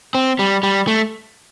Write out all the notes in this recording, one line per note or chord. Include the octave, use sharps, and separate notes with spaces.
C4
G3
G3
A3